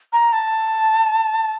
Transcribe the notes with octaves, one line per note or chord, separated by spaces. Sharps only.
A#5
A5